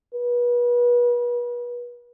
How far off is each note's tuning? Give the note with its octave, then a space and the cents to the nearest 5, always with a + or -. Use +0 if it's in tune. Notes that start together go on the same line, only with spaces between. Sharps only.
B4 -35